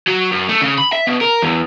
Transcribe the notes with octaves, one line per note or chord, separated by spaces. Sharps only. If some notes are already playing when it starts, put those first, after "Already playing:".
F#3
F#2
A3
C#3
B5
E5
B2
A#4
E2